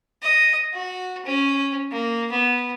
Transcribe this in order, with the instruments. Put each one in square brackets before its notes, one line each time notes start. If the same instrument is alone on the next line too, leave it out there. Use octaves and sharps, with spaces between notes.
[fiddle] D#5
F#4
C#4
A#3
B3